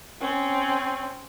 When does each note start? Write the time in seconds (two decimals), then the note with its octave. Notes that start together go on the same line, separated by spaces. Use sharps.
0.21 C4 C#4